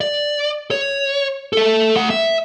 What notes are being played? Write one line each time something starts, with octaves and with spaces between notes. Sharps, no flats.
D5
C#5
A4 E5
A3 F#5
E5